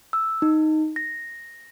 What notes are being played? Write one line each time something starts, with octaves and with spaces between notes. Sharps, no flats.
E6
D#4
A#6